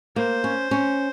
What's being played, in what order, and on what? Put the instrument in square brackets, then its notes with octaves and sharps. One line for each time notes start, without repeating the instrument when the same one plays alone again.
[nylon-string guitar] A#3 [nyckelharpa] C5
[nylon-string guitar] C#4
C#4